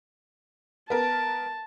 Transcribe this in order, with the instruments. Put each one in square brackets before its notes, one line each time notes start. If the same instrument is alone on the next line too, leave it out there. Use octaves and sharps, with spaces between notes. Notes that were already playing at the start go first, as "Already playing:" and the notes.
[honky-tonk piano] B3 A#4 [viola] A5